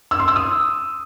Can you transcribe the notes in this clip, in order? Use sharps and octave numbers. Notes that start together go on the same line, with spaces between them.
E6
C6
E6
D#6